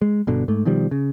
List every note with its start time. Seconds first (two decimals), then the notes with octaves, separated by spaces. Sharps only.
0.02 G#3
0.27 G1 B2 D3
0.48 G#2 A3
0.65 B2 D#3 F3 G3
0.91 C#3